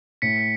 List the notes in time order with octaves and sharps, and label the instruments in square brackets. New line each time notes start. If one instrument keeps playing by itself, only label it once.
[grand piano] A2 [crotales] B6 C#7